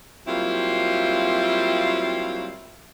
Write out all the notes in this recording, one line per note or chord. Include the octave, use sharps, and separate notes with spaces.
F#3 G3 A#3 C4 E4 F4